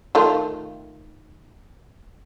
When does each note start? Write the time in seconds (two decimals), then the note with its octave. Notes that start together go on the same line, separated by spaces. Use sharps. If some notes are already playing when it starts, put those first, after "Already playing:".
0.15 D#3 A3 F4